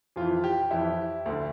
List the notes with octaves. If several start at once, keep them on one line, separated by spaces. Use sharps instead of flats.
F2 E3 F4
G4
F2 E3 E4
D2 D3